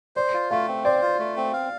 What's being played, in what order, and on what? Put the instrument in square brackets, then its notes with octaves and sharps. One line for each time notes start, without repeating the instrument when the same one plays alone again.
[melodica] C5 [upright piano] D5
[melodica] F4
[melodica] A3 [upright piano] F5
[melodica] C4
[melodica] C5 [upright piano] D5
[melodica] F4
A3
C4
F5